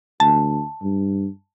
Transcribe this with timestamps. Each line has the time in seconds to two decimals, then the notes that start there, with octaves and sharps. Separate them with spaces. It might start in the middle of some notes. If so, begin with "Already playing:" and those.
0.20 D2 A5
0.83 G2